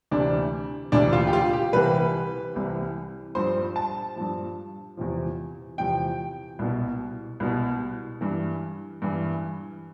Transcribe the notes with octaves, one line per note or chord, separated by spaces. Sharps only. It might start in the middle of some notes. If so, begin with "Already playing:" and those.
D2 C3 E3 D4
D2 C3 E3 D4
F4
G4
F4
G4
C2 C3 E3 B4
C2 C3 E3
G2 F3 C5
A5
G2 F3
E2 C3 F3
E2 C3 F3 G5
C2 B2
C2 B2
G2 E3
G2 E3